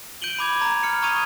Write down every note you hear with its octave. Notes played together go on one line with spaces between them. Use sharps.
G6 D7 D#7 F#7 G7
B5 D6 G#6 F7
A#5
F6 C#7
A#5 C#6 D#6 G#6 D#7 F7